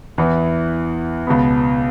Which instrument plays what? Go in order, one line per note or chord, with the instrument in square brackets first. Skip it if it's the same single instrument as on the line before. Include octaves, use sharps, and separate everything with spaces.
[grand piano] E2 E3 B3 E4
C#2 B2 B3